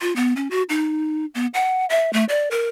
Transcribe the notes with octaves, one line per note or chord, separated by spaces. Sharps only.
F4
B3
C#4
F#4
D#4
B3
F#5
E5
A3
D5
A#4